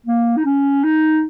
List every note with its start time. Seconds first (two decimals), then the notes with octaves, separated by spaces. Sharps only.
0.06 A#3
0.37 D#4
0.45 C#4
0.84 D#4